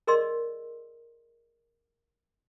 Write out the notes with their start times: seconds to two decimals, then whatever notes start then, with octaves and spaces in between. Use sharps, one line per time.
0.07 G#4 A#4 D5 D#5 C6 E6